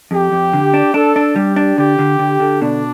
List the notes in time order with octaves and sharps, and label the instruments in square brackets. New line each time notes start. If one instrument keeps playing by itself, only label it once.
[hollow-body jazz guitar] F2 [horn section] G4
[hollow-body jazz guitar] F2
D3
D4
[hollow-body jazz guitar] D4 [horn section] A4
[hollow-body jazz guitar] D4
[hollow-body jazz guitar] G3 [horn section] G4
[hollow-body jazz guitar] D4
[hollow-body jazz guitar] D3 [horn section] G4
[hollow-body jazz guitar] D3
D3
D3
[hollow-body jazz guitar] B2 [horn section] D4